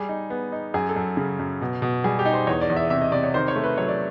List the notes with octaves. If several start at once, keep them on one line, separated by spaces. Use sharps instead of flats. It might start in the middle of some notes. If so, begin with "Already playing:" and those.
Already playing: G3 G#4
D#4
B3
D#4
F#2 G#4
A4
F#2
C#3
F#2
B2
B2
G3 G#4
G4
D#4
C5
E2 C#5
D5
E2
E5
C3 E5
D#5
C3 D5
C#5
D#3 C5
C#5
A3
B4
F#3 C#5
D5